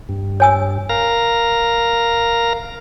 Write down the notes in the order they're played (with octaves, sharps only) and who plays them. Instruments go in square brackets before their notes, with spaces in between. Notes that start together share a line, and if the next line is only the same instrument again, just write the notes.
[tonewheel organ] G2
[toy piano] C#5 G#5 E6
[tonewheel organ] A#4 F5 A#5